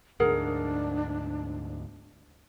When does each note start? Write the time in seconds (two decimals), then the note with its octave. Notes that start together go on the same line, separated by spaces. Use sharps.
0.20 D2 G#2 D4 G#4 A#4 F#5